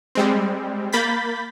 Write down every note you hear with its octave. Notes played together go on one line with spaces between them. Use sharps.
G3 G#3 C4
A#3 B5 G6 A6 B6